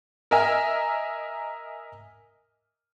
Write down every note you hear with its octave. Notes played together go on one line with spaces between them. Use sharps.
A#4 D#5 E5 G#5 F6